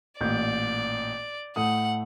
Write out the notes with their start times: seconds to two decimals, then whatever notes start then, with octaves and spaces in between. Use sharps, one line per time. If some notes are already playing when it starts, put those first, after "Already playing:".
0.21 A1 A#2 D5 G6
1.56 A2 A3 F#5 D#6